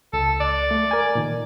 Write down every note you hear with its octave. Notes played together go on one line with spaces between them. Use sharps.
C#2 A4
D5
A3
A#4 G#5
A#2 D#3